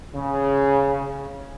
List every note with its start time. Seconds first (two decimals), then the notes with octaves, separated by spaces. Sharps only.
0.15 C#3